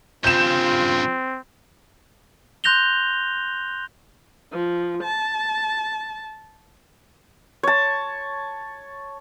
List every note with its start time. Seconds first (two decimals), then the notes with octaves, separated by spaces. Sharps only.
0.24 G2 C#3 C4 F4 G6 E7
2.64 C6 F#6 G6 A#6 F7 G7
4.52 F3
5.03 A5
7.63 C#5 A5